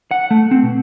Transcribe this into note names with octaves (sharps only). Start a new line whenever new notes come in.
F#5
A3
C4
B2